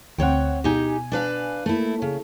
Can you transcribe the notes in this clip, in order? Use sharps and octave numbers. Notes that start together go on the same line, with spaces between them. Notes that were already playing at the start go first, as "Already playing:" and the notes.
D2 C4 C#5 F#5 G5
B2 D#4 G4 G#5
D4 B4 F5
A3 A#3 E4
C#3